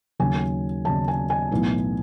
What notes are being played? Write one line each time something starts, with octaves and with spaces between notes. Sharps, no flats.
D#2 C#3 F#3 G#5
D#2 C#3 F#3 A5
G#5
G#5
B1 A2 E3 B3